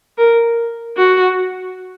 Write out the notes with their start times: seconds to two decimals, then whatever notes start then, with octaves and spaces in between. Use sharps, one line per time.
0.18 A#4
0.97 F#4